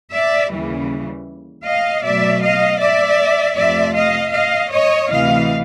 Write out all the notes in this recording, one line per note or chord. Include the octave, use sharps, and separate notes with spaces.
D5 E5
D#2 C#3 E3 G3
D#5 F5
B2 F#3 A3 D5 E5
D#5 F5
D5 E5
F2 C3 F3 A3 D5 E5
D#5 F5
D#5 F5
C#5 D#5
D2 C3 E3 D#5 F5